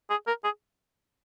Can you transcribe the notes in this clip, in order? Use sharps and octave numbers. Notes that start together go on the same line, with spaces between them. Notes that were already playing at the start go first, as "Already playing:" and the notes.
G#4
A#4
G#4